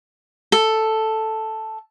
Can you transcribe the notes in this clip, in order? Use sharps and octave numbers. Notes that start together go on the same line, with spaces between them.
A4